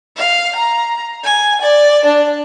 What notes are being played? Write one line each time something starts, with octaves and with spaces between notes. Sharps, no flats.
F5
A#5
G#5
D5
D4